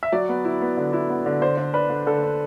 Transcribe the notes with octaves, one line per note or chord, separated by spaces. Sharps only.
E5
F#3 D5
B3
E4
B3
D3
E4
B3
D3
D3 C5
D3
D4 B4
D3
D3 A4
D4